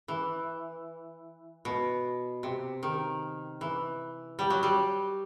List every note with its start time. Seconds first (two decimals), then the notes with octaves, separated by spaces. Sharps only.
0.08 E3
1.65 B2
2.43 C3
2.83 D#3
3.61 E3
4.39 G3
4.50 F#3
4.63 G3